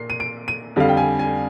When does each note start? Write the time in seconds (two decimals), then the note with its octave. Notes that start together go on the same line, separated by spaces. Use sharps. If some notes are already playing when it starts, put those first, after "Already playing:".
Already playing: A#2 A#3 C7
0.10 D#7
0.20 D7
0.48 D#7
0.76 F2 D3 G3 F5
0.89 G5
0.97 G#5
1.19 G#5